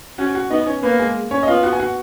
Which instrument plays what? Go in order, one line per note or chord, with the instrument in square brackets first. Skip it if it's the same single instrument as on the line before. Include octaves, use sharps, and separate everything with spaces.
[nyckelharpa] C#4 [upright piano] F#4 F#5
[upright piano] F#4 F#5
[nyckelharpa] B3 [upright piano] D#4 D#5
[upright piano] C#4 C#5
[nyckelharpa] A#3 [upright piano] B3 B4
[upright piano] G#3 G#4
C#4 C#5
D#5
[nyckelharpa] B3 [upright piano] F4 F5
[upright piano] F#4 F#5
G#5
F#4 F#5